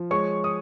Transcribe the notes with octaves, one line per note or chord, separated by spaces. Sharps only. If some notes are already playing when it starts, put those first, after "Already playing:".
Already playing: F3
G#3 C#5 C#6
D#6